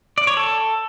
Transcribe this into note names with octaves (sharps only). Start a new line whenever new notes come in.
D5
C#5
A4